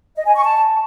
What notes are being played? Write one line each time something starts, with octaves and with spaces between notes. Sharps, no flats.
D#5
G#5
C#6
A5